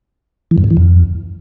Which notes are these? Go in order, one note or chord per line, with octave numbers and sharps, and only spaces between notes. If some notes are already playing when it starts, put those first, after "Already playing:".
E3
F#2
G#2
E3
F2